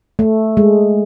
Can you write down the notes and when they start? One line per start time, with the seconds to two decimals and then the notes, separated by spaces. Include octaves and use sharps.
0.19 A3
0.57 G#3